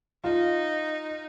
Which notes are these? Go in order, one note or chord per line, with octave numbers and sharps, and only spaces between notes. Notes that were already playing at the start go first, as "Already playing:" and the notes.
D#4 F4